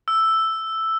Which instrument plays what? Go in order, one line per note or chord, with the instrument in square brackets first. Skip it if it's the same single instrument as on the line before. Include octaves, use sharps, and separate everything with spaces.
[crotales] E6